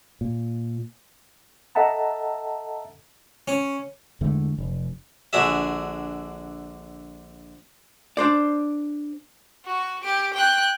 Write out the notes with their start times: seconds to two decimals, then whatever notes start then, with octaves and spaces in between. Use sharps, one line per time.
0.21 A#2
1.75 A4 D#5 E5 F#5 A5 A#5
3.48 C#4
4.21 E2 D3 G#3 A3
4.58 F1
5.33 A#1 D3 F#4 G#4 E5
8.17 D4 C5 D5
9.65 F#4
10.04 G4 D7
10.34 G5 F#6